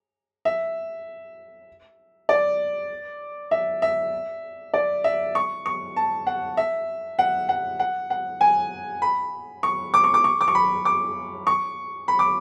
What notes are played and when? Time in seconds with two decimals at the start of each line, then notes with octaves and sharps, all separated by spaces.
0.45 E5
2.29 D5
3.51 E5
3.82 E5
4.74 D5
5.04 E5
5.35 C#6
5.66 C#6
5.96 A5
6.27 F#5
6.57 E5
7.19 F#5
7.49 F#5
7.80 F#5
8.10 F#5
8.41 G#5
9.02 B5
9.63 C#6
9.94 D6
10.04 C#6
10.14 D6
10.24 C#6
10.41 D6
10.48 C#6
10.55 B5
10.85 D6
11.47 C#6
12.08 B5
12.19 D6